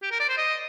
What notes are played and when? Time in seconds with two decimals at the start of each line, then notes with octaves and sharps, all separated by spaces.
0.02 G4
0.11 A#4
0.20 D5
0.29 C5
0.38 D#5